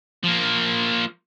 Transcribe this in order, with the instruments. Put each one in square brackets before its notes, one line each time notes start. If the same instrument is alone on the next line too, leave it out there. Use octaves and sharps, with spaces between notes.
[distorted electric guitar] F3 A#3